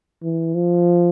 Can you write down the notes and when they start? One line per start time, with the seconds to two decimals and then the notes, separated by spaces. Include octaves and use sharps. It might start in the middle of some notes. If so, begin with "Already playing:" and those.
0.23 E3
0.54 F3